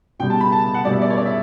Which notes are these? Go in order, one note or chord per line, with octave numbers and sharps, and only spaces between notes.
B2 G3 G5
A5
B5
A5
F#5
B2 G3 D5
E5
D5
C#5
D5
E5